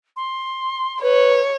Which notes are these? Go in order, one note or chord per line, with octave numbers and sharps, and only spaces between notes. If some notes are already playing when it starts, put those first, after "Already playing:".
C6
B4 C#5